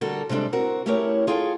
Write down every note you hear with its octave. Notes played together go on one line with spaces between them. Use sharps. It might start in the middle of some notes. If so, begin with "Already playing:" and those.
D3 G3 F#4 A4 A#4
C3 G3 G#3 D4 A4
C4 F#4 A#4
A3 C#4 E4 G4 A#4 C#5
F4 G#4 A4 G5